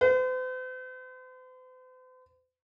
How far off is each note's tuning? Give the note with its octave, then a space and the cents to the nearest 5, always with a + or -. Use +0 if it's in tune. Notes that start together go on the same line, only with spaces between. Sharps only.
C5 -45